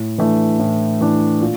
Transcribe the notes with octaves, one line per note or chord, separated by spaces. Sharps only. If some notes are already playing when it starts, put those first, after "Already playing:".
Already playing: A2
E3 A3 D4
A2
E3 A3 D4
A#2